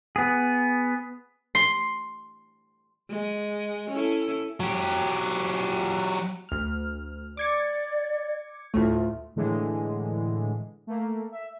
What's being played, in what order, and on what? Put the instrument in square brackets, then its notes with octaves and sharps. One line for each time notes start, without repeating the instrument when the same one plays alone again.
[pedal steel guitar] B3 G#4
[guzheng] C6
[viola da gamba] G#3
C#4 E4 A4
[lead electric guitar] F#3 G4
[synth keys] D2 F6
[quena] D5 [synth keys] D6 G#6 C#7
[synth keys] D2 A2 A3 [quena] F4
[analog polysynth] A2 D3 E3 G#3
A3 A#3
E5